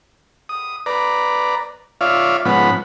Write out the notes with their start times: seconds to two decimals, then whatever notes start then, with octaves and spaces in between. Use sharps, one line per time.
0.49 D#6
0.86 B4 D5 A#5
2.01 F4 C#5 D5 E5 F5
2.45 G#2 F3 B3 C#4 F#5 B5